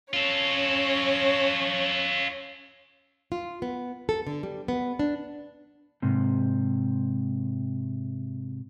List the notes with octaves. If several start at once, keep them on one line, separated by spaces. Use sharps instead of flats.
C#4 F4 A4 C#5
F4
B3
A4
D3
G3
B3
D4
G#2 C3